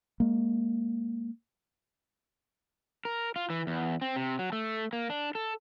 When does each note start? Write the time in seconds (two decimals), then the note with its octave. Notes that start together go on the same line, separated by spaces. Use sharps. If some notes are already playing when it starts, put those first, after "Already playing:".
0.20 G#3 A#3
3.05 A#4
3.36 F4
3.50 E3
3.67 E2
4.02 C4
4.16 C3
4.39 F#3
4.53 A3
4.93 A#3
5.10 D4
5.35 A4